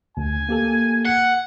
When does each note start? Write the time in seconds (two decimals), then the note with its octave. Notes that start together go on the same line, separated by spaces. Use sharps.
0.17 D2 G#5
0.49 A#3 G4 A4
1.06 F#5